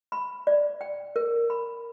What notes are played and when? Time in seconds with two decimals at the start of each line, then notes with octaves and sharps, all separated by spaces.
0.12 B5
0.47 D5
0.81 G5
1.16 A#4
1.50 B5